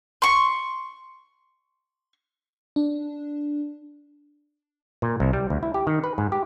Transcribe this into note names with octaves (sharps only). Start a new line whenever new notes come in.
C6 C#6
D4
A#2
C2
G3
D2
E4
G4
D#3
B4
G#2
G4